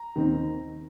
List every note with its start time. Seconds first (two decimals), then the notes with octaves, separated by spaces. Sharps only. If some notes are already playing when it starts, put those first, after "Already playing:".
Already playing: A#5
0.15 D#2 D#3 C4 D#4